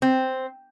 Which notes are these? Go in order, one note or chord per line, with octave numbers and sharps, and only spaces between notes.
C4